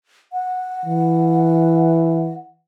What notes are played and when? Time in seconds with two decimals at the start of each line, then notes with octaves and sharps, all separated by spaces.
0.33 F#5
0.85 E3